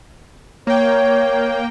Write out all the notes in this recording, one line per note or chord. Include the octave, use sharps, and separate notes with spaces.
A#3 C#5 G5